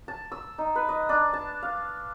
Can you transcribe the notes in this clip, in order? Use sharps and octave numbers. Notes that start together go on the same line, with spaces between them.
A5
E6
D#4
B4
D#5
D4
A5
F5